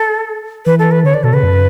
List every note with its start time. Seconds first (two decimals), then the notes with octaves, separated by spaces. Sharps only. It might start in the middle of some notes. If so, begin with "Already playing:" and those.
Already playing: A4
0.66 E3 B4
0.79 A4
0.91 B4
1.04 D3 C#5
1.14 D5
1.24 B2 A4
1.33 C#3 B4
1.43 F#2